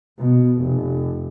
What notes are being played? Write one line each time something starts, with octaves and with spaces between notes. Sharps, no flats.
B2
F1